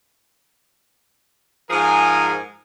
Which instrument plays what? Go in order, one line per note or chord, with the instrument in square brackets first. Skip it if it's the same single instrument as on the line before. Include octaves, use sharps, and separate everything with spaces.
[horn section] G#2 F3 G#4 A#4 G#5